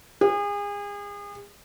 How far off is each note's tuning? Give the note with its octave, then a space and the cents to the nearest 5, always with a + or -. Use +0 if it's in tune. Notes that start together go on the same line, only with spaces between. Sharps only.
G#4 -35